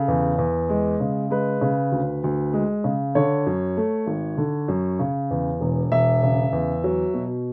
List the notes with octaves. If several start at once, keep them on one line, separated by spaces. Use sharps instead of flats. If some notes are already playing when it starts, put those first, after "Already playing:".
Already playing: C#3 A4
E2
E2
G#3
C#3
G#3 B4
C#3
D2
D2
G#3
C#3
D3 C#5
F#2
A3
G#1
D3
F#2
C#3
E2
E1
E1 E5
C#3
E2
F#3
B2